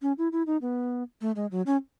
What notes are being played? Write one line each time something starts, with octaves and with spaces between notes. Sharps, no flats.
C#4
E4
E4
D#4
B3
A3
G#3
F#3
C#4